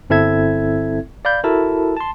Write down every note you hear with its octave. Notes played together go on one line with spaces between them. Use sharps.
G1 C4 E4 A4 E5 G#6
D5 F5 B5 G6
E4 F#4 A4 A#4 A5
A5 C6